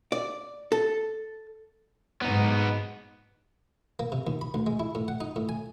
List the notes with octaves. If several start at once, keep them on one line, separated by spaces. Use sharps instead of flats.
D5
A4
G#2 B3 D#4
A#3
C3
D#2
B5
D2
G#3
E4
A2
F#5
D#4
A2
G#5